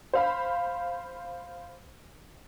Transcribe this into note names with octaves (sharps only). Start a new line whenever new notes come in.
C5 F5 B5